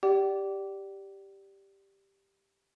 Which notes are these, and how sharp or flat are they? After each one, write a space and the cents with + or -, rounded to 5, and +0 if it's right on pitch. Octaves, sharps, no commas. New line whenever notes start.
G4 +0 D5 +0 G5 -40